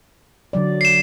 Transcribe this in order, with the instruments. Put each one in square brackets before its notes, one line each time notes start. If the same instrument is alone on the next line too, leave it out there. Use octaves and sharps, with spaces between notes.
[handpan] D3 F#3 D5
[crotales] C7 E7